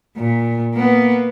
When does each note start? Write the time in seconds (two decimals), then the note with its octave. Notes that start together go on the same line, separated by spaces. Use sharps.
0.17 A#2
0.74 A#3 B3